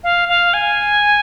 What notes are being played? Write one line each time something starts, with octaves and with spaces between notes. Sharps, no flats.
F5
F5
G#5